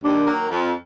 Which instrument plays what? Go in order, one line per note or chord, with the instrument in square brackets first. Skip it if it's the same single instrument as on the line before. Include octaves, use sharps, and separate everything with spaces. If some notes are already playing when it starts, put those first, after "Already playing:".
[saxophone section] D#2 [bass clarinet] D4
[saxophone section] D#3 F#3 A#3
F2